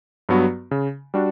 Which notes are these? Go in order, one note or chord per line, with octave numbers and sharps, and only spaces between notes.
G2 F#3 B3 F#4
C#3
G3 D4 F#4